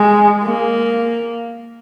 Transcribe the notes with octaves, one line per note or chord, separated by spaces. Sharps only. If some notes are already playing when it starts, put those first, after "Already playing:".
Already playing: G#3
A#3